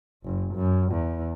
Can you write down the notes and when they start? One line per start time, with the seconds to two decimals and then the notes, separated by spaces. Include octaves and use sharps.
0.24 F#1
0.54 F#2
0.92 E2